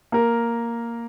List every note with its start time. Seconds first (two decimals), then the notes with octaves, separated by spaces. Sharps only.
0.12 A#3 A#4